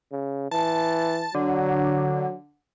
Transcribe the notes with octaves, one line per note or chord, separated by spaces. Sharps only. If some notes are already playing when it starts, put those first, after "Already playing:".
C#3
E3 A5
D3 F#3